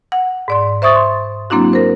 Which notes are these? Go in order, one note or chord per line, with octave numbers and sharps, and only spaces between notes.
F#5
G#2 D5 C6
C5 E5 C#6 D#6 A6
C6
F#3 A#3 C4 D4 E4 F#4
A#4 C5